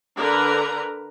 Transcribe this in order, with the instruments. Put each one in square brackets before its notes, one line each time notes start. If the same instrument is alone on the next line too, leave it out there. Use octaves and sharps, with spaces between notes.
[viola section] D3 A#4 B4 A#5